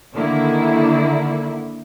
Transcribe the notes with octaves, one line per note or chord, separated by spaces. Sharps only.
D3 D#3 A#3 E4